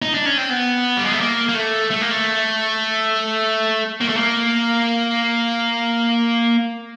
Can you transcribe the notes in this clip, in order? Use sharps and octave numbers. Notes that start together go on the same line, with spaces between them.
D#4
D4
C#4
C4
B3
G3
G#3
A3
A#3
A#3
A3
A3
A#3
A3
A#3
A3
A#3